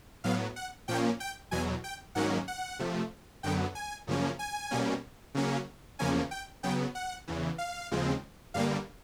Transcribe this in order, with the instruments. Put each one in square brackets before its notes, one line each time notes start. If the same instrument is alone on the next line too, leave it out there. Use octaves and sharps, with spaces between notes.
[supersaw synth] A2 F#3 B3 F5
F#5
A#2 F3 A#3 C#4 G5
G5
E2 B2 F#3 G#5
G5
G#2 D#3 F#3 A#3 C#4 F#5
F#5
C3 F3 A3
F#2 D3 F#3 B3 G5
G#5
F#2 C#3 F3 A#3 C#4
G#5
B2 G3 A#3 C#4
C#3 F#3 A#3 C#4
E2 C#3 F3 A#3 C#4 G#5
G5
C#3 F#3 B3 G5
F#5
E2 C#3 E3
F5
D#2 C#3 F3 G#3 C4
G2 D3 G3 A#3 F5